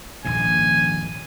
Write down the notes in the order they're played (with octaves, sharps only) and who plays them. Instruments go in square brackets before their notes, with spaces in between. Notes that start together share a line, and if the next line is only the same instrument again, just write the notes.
[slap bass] D#1 A#1 G#2 [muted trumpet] G#5